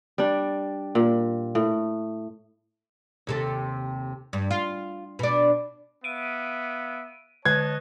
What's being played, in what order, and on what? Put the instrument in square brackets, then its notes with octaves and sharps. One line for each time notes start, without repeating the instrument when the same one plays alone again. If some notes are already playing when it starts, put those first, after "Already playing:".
[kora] G3 D4
A#2
A2
[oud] D#2 C3 A4
G2
F4
B2 D4
[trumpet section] B3 E5 F5 [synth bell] D7 D#7
[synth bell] D3 F#6 [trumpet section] C#5 D#5 A5 [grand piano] G#6